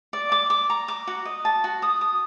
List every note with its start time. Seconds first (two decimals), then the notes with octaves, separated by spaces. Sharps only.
0.13 D5
0.32 D6
0.50 D6
0.70 A#5
0.88 D6
1.07 F#4
1.25 D#5
1.45 A5
1.64 F#4
1.82 D#6
2.01 D#6